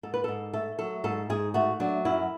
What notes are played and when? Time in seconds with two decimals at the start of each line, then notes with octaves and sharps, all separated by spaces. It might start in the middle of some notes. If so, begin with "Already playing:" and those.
0.03 G#2 A4
0.14 B4
0.24 G#2 A4
0.54 A3 A4
0.79 F#3 A4
1.04 G#2 A4
1.30 G#2 G#4
1.54 A3 F#4
1.80 F#3 D4
2.05 F#2 E4